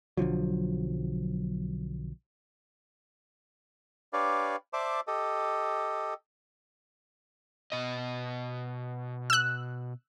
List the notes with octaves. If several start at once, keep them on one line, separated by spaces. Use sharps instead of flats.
B1 D3 F3 F#3
D4 G4 B4 C#5 D5 F5
C5 D5 E5 A5 D6
G4 A4 D#5
B2 D#5
E6 F#6